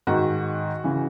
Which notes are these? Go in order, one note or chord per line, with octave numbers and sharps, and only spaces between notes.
G#2 D#3 F#4
C#3 E3